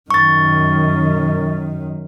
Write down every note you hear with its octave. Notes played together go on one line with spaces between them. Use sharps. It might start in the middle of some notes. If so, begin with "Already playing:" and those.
F#2 D#3 C#6 A6